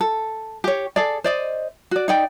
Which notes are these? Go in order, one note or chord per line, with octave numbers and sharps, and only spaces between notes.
A4
G4 C#5
G#4 A4 D5
C5 D5 D#5
F#4 D5
D#4 D5 G5